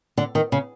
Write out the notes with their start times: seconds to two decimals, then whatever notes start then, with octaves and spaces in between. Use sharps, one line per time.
0.17 D3
0.35 D#3
0.52 C#3